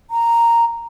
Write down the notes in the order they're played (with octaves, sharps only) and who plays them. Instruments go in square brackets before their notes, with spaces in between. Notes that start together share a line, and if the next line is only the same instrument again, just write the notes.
[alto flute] A#5